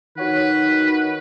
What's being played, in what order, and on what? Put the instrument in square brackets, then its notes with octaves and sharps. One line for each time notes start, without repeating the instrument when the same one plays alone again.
[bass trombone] D#3 [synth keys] F#4 C#5 F#5 [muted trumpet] B4